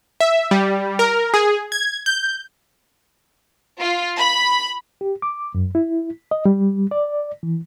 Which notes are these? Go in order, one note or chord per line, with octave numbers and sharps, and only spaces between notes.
E5
G3
A#4
G#4
G#6
G6
F4
B5
G4
D6
F#2
E4
D#5
G3
D5
E3